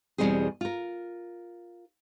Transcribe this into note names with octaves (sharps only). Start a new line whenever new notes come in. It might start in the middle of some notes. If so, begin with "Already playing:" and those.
E2 G2 B2 G3 C4 G#4
F4 A#4